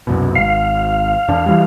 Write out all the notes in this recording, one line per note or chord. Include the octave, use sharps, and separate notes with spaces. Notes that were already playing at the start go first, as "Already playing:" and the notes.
C2 F#2 B2
G#1 F5
E2 D4
E3 G3